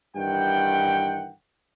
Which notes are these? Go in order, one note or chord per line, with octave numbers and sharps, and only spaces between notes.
G2 D#3 E3 F#5 G5